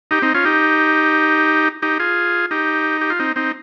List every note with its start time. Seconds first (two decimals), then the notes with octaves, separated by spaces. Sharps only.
0.11 D#4 G4
0.22 C4 D#4
0.34 C#4 F4
0.45 D#4 G4
1.82 D#4 G4
1.99 F4 G#4
2.51 D#4 G4
3.01 G4
3.10 F4
3.19 C4 D#4
3.36 C4 D#4